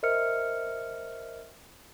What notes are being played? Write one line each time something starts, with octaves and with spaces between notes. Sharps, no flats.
A#4 C5 D#5 E5 F6 C#7